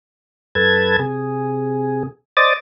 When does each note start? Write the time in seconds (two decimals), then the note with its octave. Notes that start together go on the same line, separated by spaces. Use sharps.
0.55 F#2 A4 B4 A5 G#6
0.99 C3 G#4
2.37 C5 D5 D#5 D6 D#6 A6